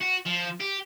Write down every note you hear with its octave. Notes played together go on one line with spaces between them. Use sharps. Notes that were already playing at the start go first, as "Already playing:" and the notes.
F#4
F3
G4